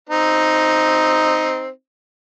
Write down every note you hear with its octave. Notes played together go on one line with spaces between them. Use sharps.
C4 D#4